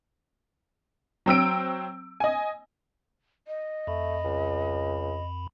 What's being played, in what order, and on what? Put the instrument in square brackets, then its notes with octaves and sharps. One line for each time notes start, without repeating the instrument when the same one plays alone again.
[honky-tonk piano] F#3 C4 E6 D7
D#5 G#5
[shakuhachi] D#5
[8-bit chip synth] F2 B5 [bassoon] A3
[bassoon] C#2